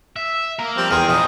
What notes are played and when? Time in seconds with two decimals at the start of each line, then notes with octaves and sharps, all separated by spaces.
0.16 E5
0.59 A#3 A#4
0.77 F3 G3 C4
0.91 E2 G#4 A#4 G5
1.08 A#2 F3 D#5